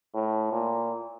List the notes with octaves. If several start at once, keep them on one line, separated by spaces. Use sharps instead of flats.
A2
A#2